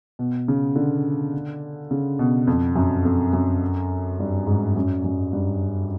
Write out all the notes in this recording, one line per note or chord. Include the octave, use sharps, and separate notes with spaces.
B2
C#3
D3
C#3
B2
F2
F#2
F2
F#2
G2
G#2
F#2
F#2
G2